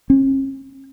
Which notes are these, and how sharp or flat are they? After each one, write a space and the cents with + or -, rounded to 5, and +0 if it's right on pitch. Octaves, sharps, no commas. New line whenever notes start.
C#4 -45